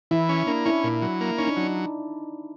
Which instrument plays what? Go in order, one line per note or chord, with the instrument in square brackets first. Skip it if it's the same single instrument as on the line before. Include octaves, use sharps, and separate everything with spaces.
[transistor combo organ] E3 [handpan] E4
[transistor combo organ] C#4
[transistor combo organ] A#3 [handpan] D4
[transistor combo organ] C#4 [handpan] E4
[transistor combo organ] A#2
F#3
A#3
[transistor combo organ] C#4 [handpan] D#4
[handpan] D4
[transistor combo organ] F#3 [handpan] D#4